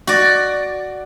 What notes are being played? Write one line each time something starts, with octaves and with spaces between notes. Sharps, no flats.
F#4 D5